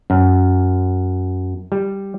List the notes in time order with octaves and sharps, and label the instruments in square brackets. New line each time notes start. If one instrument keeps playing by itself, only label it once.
[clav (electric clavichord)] F#2
G3